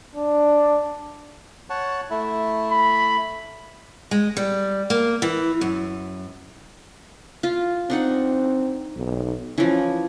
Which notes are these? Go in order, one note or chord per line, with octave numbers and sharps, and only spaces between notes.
D4
C#5 F#5 A5
A3 E4
B5
G#3
G3
A#3
E3
F#2
F4
C4 D4 D#4 F#5
B1
E3 F3 C#4